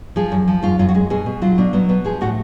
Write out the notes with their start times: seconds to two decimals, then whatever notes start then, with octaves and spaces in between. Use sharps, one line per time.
0.16 F3 G#4
0.32 F#2
0.48 F3
0.63 F#2 F4
0.79 F#2 F4
0.89 F#4
0.94 G#3 G#4
1.10 B2 G#4
1.26 B2
1.42 F#3 F4
1.58 B2 D4
1.73 F#3 B3
1.89 B2 B3
2.04 F3 G#4
2.21 A2 F#4